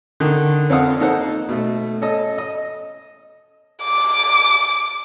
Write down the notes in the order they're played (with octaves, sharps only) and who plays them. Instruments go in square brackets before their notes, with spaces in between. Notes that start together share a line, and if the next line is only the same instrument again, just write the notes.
[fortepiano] D3 D#3
F2 C4 A4 F5 F#5 D#6
A#3 D#4 A4 C5 F#5
B2 A3
C#4 A4 D#5
D#5
[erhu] D6